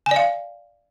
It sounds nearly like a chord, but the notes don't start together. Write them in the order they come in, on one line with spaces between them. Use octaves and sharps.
G#5 D5 F5